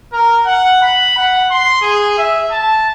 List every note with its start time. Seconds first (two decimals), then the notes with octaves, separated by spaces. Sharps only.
0.12 A#4
0.46 F#5
0.82 B5
1.17 F#5
1.51 C6
1.82 G#4
2.18 E5
2.51 A5